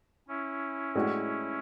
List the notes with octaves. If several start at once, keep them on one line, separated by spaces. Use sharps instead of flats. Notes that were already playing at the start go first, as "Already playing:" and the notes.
C#4 E4
A2 G#3 D4 F#4